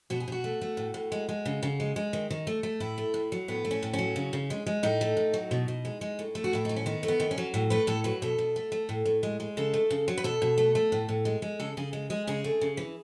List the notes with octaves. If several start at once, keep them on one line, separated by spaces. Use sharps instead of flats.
B2 F#4
G#4
B2 F#4
A3
A3
A2
A2
G#3
G#3
C#3
C#3
G#3
G#3
D#3
D#3
A3
A3
A2 E4
A3
A2
F#3
A2 B3
A3
C#4
A2
C#4
F#3
C#3
C#3
G#3
G#3
A2 D#4
A3
A2
F#3
B2
B2
G#3
G#3
A2
A3
F#4
A2 E4
F#3 D#4
C#4
D#3 B3
A3
B3
D#3
C#4
F#3
A2
A3 B4
A2 A4
F#3 B4
B2 A4
B2
A3
A3
A2
A2
G#3
G#3
C#3 A4
A3
C#3
F#3
B4
B2 A4
B2
A3
A3
A2
A2
G#3
G#3
C#3 A4
C#3 G#4
G#3
G#3 G#4
C#3 G#4
A3
C#3
E3